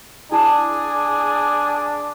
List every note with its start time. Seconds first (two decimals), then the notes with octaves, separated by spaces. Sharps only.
0.32 D4 E4 G#4 A5